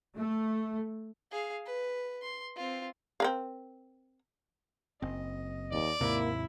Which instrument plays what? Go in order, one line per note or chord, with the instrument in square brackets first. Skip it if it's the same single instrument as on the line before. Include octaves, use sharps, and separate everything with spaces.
[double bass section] A3
[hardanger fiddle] G#4 F5
B4
C6
C4 F4
[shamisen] C4 A#4 F5
[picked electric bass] F#1 C4 [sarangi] D#5
[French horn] D#2 [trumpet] D5
[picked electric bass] D#2 G#2 C3 [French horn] A#3 [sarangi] E4